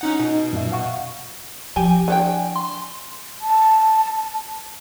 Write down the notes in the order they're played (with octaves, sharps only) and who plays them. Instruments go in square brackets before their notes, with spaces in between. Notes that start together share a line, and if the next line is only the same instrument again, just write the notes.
[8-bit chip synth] C#4 D#4 F#5
[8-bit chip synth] B2 [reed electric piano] D#4
[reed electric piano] F#2 A#2 E5
F5 F#5 C#6
[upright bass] F3 E4 [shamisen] G4 [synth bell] G#5
[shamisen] D3 C#4 G5
[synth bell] C6
[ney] A5